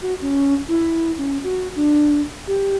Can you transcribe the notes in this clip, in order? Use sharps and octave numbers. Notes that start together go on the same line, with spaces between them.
F#4
C#4
E4
C#4
F#4
D4
G4